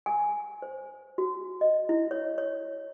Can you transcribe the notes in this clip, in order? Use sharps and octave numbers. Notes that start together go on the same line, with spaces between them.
G#5
C5
F#4
D#5
E4
C#5
C#5